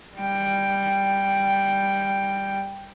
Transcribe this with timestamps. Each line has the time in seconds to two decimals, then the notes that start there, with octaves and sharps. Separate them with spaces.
0.17 G3 G5